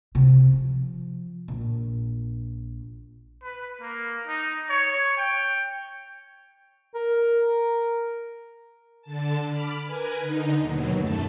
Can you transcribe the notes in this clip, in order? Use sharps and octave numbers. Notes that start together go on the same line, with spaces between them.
C3
F3
A#1
B4
A#3
D#4
C#5
G5
A#4
D3 A5
B5 D6 F6
A#4 B4 G#5
D3 D#4
D#2 B2 F#3
F#2 A3 A4